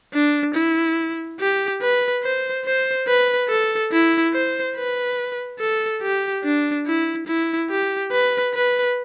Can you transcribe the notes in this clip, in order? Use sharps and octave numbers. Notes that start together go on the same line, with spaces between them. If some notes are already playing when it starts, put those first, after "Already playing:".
D4
E4
G4
B4
C5
C5
B4
A4
E4
C5
B4
A4
G4
D4
E4
E4
G4
B4
B4